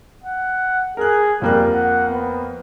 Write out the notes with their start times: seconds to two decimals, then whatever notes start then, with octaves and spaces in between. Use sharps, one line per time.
0.24 F#5
0.97 G#4 A#4 F#6
1.42 F2 G3 A#3 F#6
1.74 F#5
2.09 B3